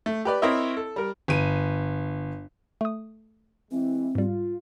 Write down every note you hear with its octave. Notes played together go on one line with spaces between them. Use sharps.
A3
G4 B4 D5
C4 E4 A#4 C#5 D#5 E5
A4
G3 A#4
G1 D#7
A3 D#6
E3 G#3 C4 E4
G#2 G3 F4